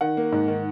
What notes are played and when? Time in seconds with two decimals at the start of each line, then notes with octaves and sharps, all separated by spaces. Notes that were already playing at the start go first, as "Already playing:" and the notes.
0.01 D#3 F#5
0.17 A#3
0.32 G#2
0.48 D#3